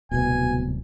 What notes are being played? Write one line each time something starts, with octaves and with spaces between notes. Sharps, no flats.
D1 C2 B2 G#5